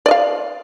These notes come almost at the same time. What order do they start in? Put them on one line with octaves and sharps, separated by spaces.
D5 D#5 F5